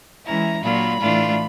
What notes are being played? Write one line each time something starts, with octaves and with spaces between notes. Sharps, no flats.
E3 G#3 C#4 E4 A#5
A#2 F#3 A#3 D4 F4 B5
A2 E3 A3 D4 F4